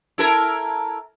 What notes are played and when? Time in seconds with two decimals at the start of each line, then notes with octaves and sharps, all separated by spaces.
0.18 E4 A4 A#4